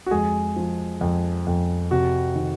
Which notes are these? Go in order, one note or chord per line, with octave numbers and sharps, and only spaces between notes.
F#4
F2 G#3 G#4
F3
F2
F2
C3 F#4
D#3